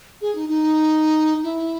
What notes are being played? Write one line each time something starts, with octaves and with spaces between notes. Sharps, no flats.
G#4
D#4
D#4
E4